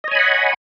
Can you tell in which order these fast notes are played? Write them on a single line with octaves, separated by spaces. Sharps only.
D#5 C#5 G#5 B5 F#5